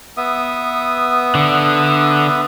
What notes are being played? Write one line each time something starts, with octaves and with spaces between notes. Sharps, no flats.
B3 E5 D#6
D3